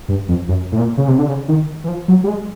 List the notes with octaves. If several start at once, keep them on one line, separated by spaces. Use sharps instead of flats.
G2
F2
F#2
A2
A#2
C#3
C3
D3
C#3
D#3
E3
F3
F#3
G3
G#3